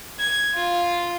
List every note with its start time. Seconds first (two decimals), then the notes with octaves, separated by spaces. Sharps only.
0.20 G#6
0.54 F4